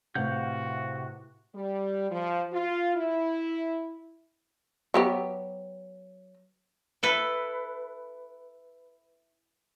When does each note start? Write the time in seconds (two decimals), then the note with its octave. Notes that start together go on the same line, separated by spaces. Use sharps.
0.15 A2 C3 F#4 B4 F5 F#5 G6
1.55 G3
2.11 F3
2.53 F4
2.96 E4
4.94 F#3 B3 G4
7.03 E4 A4 B4